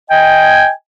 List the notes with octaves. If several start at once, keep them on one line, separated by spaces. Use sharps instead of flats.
D#5 G5 G#5